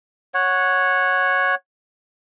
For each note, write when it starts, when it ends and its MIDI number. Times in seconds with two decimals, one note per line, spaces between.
0.34 1.55 73
0.34 1.55 78